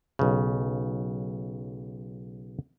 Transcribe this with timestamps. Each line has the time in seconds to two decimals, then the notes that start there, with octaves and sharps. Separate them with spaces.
0.19 B1 C#3